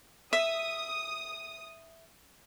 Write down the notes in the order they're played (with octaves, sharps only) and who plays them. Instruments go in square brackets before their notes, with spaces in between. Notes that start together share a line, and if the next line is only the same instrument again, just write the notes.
[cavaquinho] E5 [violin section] D#6